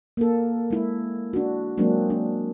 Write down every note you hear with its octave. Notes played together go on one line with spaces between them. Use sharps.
A#3 A4
G#3 E4
D4 F#4
F#3 G#3 A#3 C4 D4
D4